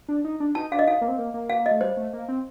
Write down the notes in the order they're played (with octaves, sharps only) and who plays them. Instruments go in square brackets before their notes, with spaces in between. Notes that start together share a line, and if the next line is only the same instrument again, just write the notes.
[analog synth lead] D4
D#4
D4
[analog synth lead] D#4 [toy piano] A5
[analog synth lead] D4 [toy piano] F5
[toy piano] D#5
[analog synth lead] D#4 [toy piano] F5
[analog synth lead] A#3
C4
A#3
A#3
[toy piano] F5
D#5
[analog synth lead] A3
[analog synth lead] G3 [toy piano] C5
[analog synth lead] A3
A#3
C4